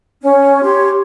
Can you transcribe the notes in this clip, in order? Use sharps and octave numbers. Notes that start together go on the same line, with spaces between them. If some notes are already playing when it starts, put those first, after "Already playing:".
C#4
G4 C#5 C6